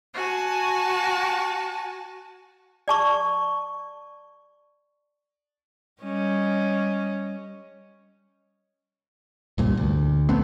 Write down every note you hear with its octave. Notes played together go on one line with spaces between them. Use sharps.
F#4 G#5 A5
D5 A5 C#6
G3 C#4 D#5
C2 G2 A#2
D2
A#1 A3 B3 C4